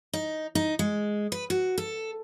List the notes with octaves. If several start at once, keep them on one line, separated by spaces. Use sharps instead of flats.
D#4
D#4
G#3
B4
F#4
A4